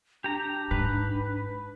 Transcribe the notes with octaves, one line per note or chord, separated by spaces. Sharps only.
D4 G4 A#5
G#2 B4